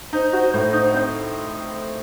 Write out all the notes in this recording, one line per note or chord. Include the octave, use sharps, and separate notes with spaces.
D#4 C5
F#4
A2 C5
D#4
C4